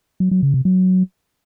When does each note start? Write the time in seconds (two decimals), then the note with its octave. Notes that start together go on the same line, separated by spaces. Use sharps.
0.20 F#3
0.31 F#3
0.43 C#3
0.54 C3
0.65 F#3